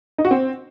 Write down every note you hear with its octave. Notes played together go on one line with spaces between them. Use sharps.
D#4
F#4
C4